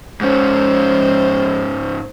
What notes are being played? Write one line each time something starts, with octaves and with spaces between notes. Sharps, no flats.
G#2 C#4 C5